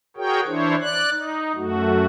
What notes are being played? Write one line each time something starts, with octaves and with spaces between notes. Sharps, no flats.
F#4 G#4 A#4 C#5 G5
E3 D4 E4 C5 C#5
D5 F#6
D#4
F#2 A3 F#4